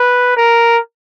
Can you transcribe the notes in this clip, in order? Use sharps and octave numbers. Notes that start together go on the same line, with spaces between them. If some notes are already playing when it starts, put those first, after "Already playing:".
Already playing: B4
A#4